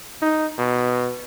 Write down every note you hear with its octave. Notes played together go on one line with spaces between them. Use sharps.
D#4
B2